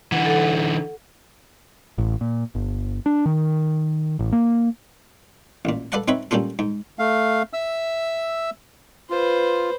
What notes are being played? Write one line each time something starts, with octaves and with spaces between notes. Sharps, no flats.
D3 E3 F#5
A4 F#5
A1
A#2
G1
D4
D#3
A1
A#3
A1 A#2
A4 B4 D5 F5 F#5 A5
C4 D#4 B4 C#5 E5
G3 A#3 C#4 F4 A4
G#2
A3 F5
E5 E6
F4 B4 C5